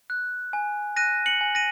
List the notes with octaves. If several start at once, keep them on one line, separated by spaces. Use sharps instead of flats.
F#6
G#5
F#6 A#6 D#7
C#7 F#7
G#5
A#6 D#7